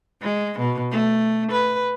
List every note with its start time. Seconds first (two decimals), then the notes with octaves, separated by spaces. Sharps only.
0.23 G#3
0.59 B2
0.91 A3
1.51 B4